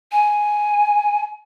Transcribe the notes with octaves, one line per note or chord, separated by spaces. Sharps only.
G#5